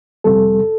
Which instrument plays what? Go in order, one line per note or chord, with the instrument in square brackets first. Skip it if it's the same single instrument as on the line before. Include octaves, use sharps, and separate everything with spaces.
[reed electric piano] F2 C3 G3 A4